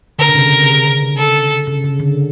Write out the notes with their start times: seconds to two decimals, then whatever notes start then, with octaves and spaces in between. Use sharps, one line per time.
0.19 D3 A#4
0.29 C#3
0.35 C3
0.52 C#3
1.17 A4
1.67 C#3
1.84 C#3
2.00 D3